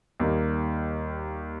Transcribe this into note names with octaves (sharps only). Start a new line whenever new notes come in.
D#2 D#3 G3 A#3 D#4